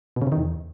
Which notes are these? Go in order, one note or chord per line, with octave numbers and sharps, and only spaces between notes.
B2
C#3
C3
D#3
E2